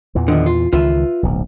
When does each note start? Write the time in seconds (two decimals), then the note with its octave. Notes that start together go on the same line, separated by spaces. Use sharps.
0.15 E2 A#2 E3
0.28 D3 D#3 F3
0.46 F4
0.73 C#2 D#3 E3 F4 B4 E5
1.23 D1 B1